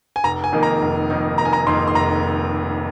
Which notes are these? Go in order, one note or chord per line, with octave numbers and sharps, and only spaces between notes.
G#5
F1 A#5
G#5
F2 D#3 A#3 D#4
A#5
F1
F2 D#3 A#3 D#4
F1 A#5
G#5
A#5
F2 D#3 A#3 D#4 C6
C6
F1 A#5